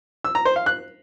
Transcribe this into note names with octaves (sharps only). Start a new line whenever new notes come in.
E6
A#5
C5
F5
F#6